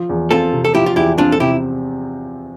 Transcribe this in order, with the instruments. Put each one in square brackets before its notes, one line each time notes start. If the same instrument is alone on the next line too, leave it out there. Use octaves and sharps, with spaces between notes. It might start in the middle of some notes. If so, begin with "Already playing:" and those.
Already playing: [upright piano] F3
E2
[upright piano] C4 [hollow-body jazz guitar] F4 A4
[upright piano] C3
[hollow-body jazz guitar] A4
[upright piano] F3 [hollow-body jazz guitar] E4 G4
[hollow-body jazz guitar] F4
[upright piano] E2 [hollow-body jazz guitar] E4 G4
[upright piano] C4 [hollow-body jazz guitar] D4 F4
[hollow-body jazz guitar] A4
[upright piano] C3 [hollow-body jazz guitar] E4 G4